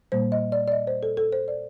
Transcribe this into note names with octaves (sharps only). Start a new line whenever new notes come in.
A#2 G3 A#3 C5
D#5
D5
D5
D#5
C5
A4
A4
C5
D5